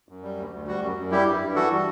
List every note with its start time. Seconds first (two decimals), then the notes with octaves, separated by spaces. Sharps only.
0.09 F#2
0.23 G3
0.37 D2
0.52 D2
0.67 G3 F#4
0.81 F#2
0.97 F#2
1.11 G3 E4 G4
1.27 G2
1.41 G2
1.56 E3 F#4 A4
1.71 G3